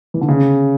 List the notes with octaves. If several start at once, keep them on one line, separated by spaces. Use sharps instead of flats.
E3
D3
C#3